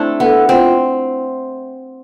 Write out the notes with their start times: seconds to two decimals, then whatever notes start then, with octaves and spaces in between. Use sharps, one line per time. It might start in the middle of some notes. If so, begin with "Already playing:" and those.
Already playing: A3 C4 D4 E4
0.20 B3 A4
0.49 C4 F4